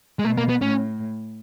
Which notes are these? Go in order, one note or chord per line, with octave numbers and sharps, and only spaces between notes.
G#3
B2 A3
A#3
B3
A2 C#4